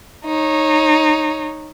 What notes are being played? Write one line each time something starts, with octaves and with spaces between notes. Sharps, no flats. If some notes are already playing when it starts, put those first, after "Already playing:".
D#4 C#5